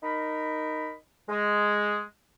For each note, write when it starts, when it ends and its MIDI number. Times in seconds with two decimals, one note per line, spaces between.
0.03 0.93 63
0.03 0.93 70
0.03 0.93 83
1.29 2.01 56